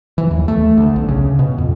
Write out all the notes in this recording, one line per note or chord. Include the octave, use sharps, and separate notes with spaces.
E3
D#2
A3
D2
B1
C#3
B2
F2